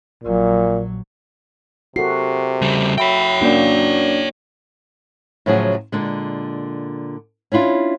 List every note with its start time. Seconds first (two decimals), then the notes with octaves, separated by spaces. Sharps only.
0.24 A#1 A#2 F#3
1.96 C3 F#4 A4 A#4 C7
2.62 C#3 G3
2.98 F#3 C#5 E5 G5 B5 B6
3.41 A#3 C#4 D4 F#4 D5
5.46 A2 C#3 F3 F#3 F#4 G#4
5.92 A#2 D3 G#3
7.52 C#4 D4 E4 F4